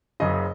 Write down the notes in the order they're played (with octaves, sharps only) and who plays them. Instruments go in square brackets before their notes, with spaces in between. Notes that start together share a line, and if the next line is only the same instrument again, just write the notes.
[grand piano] F#1 F#2 C#3 D#5